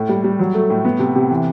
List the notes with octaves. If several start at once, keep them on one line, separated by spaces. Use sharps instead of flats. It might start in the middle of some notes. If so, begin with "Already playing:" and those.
Already playing: A2
G3
G3
F#3
A3
A2
B3
C3
C3
E3